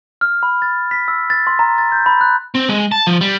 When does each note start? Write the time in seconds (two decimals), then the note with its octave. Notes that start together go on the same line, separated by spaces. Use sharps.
0.21 F6
0.43 B5
0.62 A6
0.91 B6
1.08 E6
1.30 A6
1.47 C6
1.59 A#5
1.78 A6
1.92 G6
2.06 B5
2.21 F#6
2.55 C4
2.69 G#3
2.92 A5
3.07 F3
3.21 G3